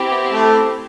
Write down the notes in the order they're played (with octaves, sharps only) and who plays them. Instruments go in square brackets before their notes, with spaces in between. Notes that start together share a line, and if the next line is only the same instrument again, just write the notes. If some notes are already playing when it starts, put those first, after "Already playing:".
Already playing: [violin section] C4 E4 G4
[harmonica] B3
A3